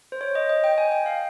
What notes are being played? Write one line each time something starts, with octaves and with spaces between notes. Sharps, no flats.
C5
C#5
D#5
D#5
G5
G#5
G5
F5